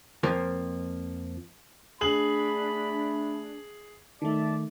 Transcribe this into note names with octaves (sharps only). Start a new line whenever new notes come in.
F2 F3 A#3
A3 D4 G#4 B5 F#7
D#3 A3 D5 E5 A5